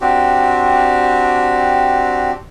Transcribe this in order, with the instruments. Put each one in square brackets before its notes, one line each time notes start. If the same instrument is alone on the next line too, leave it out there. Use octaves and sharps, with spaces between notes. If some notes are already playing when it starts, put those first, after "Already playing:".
[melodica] C4 D4 F#4 G4